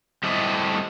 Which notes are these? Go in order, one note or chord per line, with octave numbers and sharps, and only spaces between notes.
G3 A3 C4 E4 D5 D#5